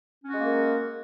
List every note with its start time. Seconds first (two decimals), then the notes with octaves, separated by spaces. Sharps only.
0.24 C#4
0.29 F#4
0.34 G#3
0.38 A#3
0.43 A#4